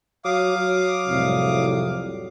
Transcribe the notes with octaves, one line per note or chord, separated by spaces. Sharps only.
F#3 F5 D6 D#6
F#3
C2 F2 A2